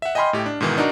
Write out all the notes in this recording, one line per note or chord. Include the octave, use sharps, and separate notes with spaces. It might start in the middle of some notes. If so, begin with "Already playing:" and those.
E5 F#5
D#5 G5 G#5 B5 C6 F6
A2 G4
D4
G#2 B2 D#3 E3
D4 D#4 F#4 A#4